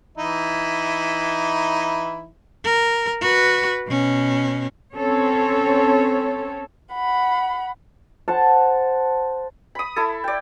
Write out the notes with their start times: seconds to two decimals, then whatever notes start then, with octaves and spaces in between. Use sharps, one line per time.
0.18 E3 D#4 E4
2.65 A#4
3.21 F#4 B4
3.88 B2 C#4
4.94 C4 C#4 A4 C#5
6.94 F#5 B5
8.28 C5 F#5 A5
9.75 B5 D#6
9.96 E4 A4
10.24 D5 G5